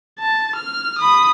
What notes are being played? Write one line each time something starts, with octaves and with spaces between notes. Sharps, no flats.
A5
F6
B5 D#6